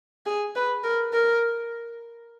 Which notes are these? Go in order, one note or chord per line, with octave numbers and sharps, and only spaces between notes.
G#4
B4
A#4
A#4